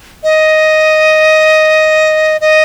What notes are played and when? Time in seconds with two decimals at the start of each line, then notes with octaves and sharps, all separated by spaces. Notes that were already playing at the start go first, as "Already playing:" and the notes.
0.24 D#5
2.41 D#5